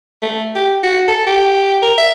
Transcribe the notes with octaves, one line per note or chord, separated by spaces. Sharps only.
A3
G4
F#4
A4
G4
A#4
E5